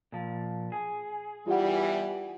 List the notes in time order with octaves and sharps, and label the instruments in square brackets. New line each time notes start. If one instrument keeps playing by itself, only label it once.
[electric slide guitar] A#2 F3
G#4
[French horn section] E2 E3 G3 [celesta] F4 G4 F#5